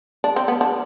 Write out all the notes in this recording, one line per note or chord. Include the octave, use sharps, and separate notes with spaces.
D4
C4
B3
D4